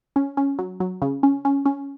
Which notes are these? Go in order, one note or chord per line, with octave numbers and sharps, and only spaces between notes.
C#4
C#4
F#3
F#3
C#3
C#4
C#4
C#4